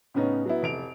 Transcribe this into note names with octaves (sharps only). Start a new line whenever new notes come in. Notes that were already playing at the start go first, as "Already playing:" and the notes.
A2 C#3 B3 C#4 D#4
F#3 B3 E4
F1 D7 F7